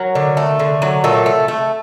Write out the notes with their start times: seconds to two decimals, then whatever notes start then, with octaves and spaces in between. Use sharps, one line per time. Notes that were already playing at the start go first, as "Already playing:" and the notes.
Already playing: F#3 A#4
0.15 D3
0.37 A3
0.59 D3
0.82 F#3
1.04 A#2 A3 A4
1.26 A3
1.48 A3